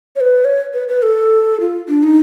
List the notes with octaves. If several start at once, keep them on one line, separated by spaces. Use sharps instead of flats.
C#5
B4
C#5
B4
B4
A4
F4
D4
D#4